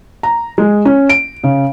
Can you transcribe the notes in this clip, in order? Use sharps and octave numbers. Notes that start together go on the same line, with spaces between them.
A#5
G#3
C#4
D7
C#3